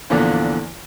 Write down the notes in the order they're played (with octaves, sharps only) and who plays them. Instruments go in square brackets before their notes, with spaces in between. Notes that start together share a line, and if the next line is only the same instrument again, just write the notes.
[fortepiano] E2 A#2 D3 E3 F3